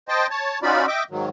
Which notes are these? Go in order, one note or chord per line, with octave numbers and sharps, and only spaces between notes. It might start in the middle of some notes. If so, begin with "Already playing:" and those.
C5 D#5 G5 A5
C#5 A5
C#4 D#4 F4 F#4 D5 B5
D#5 E5 G5 D6
G#2 D#3 F#3